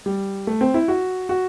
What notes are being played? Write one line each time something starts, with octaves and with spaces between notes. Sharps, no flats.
G3
A3
C4
E4
F#4
F#4